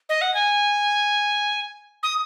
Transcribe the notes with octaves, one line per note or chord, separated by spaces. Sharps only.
D#5
F#5
G#5
D#6